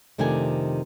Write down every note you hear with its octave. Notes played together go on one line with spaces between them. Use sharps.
F2 C3 D#3 A3 D4 G#5